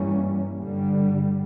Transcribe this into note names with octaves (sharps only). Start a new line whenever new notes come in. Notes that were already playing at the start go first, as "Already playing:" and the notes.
Already playing: G2 E3 G3 A#3 C#4
G2 D3 G3